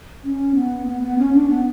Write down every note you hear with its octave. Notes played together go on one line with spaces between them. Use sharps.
C#4
B3
B3
B3
C#4
D4
B3